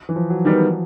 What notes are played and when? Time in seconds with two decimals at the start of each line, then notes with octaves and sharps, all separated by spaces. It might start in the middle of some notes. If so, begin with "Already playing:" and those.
0.09 E3
0.16 F3
0.30 F#3
0.45 D#3 G3 B3